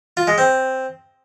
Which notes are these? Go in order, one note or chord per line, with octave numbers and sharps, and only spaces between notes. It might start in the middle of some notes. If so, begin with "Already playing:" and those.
F4
G#3
C4